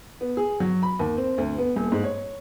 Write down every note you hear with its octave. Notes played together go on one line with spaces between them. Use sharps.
B3
G#4
F#3
B5
D#2
C4
D2
B3
D#1
G#2
C#5